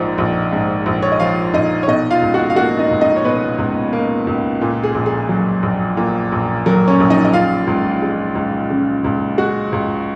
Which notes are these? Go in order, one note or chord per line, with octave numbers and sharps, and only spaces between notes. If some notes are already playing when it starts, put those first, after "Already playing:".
Already playing: A#1 G#2 F3 D#4
A#1
G#2
A#1
C#5
D#5
F3 F4 F5
A#1 D#4 D#5
C#5
B2 D#4 D#5
F4 F5
C#2
F#4 F#5
F5
A#3 F#4 F#5
D#4 D#5
C#2
D#4 D#5
C#5
B2 B3 B4
C#2
A#3
C#2
A#2
G#4
A#1
G#4
F#3
A#1
A#2
A#1
F#3 A#4
C#4 C#5
A#1
D#4 D#5
D#5
C#3 F4 F5
C#2
G#3
C#2
C#3
C#2
G#3 F#4 F#5
C#2